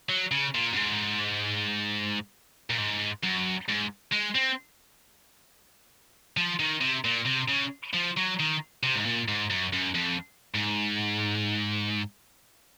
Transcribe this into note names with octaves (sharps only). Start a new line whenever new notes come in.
F#3
C#3
A#2
F#2
G#2
A#2
G#2
F#2
G#2
G#3
C4
F3
D#3
C3
A#2
C3
C#3
F3
F#3
D#3
C3
G#2
A#2
G#2
F#2
F#2
F2
G#2